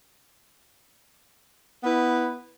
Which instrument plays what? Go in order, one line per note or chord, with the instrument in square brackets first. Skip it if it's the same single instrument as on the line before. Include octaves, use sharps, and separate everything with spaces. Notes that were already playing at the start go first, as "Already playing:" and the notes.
[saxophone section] B3 E4 B4